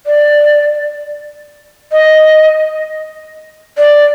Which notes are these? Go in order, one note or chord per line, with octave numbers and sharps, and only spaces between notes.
D5
D#5
D5